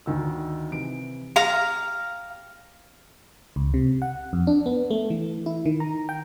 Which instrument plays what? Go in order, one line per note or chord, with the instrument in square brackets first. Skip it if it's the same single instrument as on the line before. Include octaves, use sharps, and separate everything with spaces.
[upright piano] D2 D#3 E6
C3 E3 D7
[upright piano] G4 [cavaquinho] F5 A#5
[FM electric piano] C#2
C3
F#5
F2
D4
B3
A3
E3
E4
D#3
A#5
G5